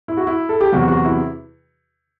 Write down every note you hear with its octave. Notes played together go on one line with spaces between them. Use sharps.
E4
F#4
E4
A4
G4
E2 C3 F#3 F#4
F#4
E4